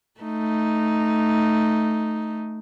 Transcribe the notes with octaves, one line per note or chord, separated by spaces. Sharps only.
A3 D#4